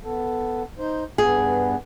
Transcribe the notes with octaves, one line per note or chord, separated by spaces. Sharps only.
B3 A4
D#4 C5
G2 B3 G#4